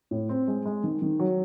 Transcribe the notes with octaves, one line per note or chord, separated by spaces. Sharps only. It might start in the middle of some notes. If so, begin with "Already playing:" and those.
A2
C4
G#3
G#3
D#3
D#3
F#3